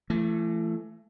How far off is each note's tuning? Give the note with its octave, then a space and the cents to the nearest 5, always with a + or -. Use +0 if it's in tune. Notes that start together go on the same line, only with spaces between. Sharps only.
E3 +35 A3 +0